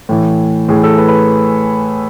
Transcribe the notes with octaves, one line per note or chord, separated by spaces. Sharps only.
A2 E3
A2 E3 G#4
A4
B4
B4